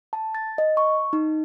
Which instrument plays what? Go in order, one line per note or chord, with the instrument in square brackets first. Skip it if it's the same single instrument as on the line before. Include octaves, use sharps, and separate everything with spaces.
[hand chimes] A5
A6
D#5
C#6
D#4